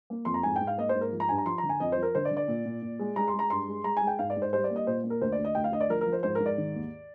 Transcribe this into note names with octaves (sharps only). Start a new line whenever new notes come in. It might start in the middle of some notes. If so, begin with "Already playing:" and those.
A#3
F2 C6
A#5
G#2 G#5
G#2 G5
F5
A#3 D#5
C5
G#2
A#4
F3
A#5
G2 G#5
A#5
F3 C6
A#5
D3
G#5
F2 D#5
C5
F3
A#4
D3 C5
D5
D3
D5
A#2
A#2
A#2
G#3
G#3 A#5
C6
G#3
A#5
G2 C6
G#3
G#3 A#5
G#5
G#3
G5
G#2 F5
D5
G#2
C5
G3 C5
D5
A#3
D#5
A#2 C5
A#3
A#4
D2 C5
D5
D2
D#5
D2 G5
F5
D2 D#5
D5
F3 A#4
A#4
F3
C5
G#2 C5
G#2 A#4
D5
D#3
D#2